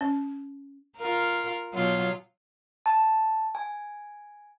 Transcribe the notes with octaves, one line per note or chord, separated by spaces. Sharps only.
C#4
F4 A#4
B2 F#3 F4
A5
G#5